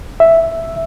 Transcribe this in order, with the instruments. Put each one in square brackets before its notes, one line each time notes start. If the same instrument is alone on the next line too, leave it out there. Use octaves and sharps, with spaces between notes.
[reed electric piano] E5